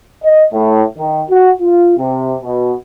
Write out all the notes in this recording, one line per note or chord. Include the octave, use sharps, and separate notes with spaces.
D#5
A2
D#3
F#4
F4
C3
B2